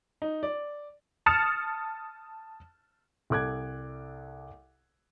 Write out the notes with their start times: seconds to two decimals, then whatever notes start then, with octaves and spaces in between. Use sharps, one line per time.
0.22 D#4
0.43 D5
1.26 A5 D#6 F6 A6 C#7 E7
3.30 C2 A4 D6 F#6 G#6